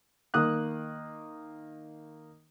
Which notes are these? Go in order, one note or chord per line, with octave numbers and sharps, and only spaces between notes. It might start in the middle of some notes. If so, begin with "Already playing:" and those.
D#3 A#3 D#6 F#6